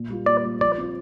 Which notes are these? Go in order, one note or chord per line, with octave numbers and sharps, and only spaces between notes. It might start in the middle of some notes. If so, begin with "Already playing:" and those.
Already playing: A#2
G3 A#3 F4
A#2 D5
G3 A#3 F4
F3 D5
C4 F4